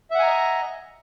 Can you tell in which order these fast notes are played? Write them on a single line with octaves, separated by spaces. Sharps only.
E5 F#5 G#5 A#5 D#5